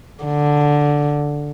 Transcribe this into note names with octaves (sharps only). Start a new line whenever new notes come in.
D3